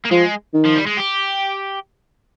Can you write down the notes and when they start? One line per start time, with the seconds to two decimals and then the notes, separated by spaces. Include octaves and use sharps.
0.05 A#3
0.11 F3 G#3
0.54 D#3
0.65 F3
0.75 G3
0.86 G#3
0.97 G4